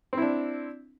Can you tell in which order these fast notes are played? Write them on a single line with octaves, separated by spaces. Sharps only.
C4 E4 D4